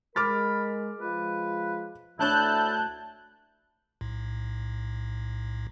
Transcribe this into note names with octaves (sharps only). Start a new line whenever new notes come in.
G#3 A#4 B5 D6 F6 A6
F3 G#3 F4 B4
D2 A3 D4 E4 C#5 A5 F#6 G6
B1 A2